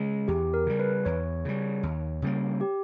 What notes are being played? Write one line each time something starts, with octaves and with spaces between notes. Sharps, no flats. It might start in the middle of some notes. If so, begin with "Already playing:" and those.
Already playing: C#3 G#3 G#4
E2 G4
A#4
C#3 G3
B4
E2 C#5
C#3 G3
D#2
C#3 G3 A#3
G4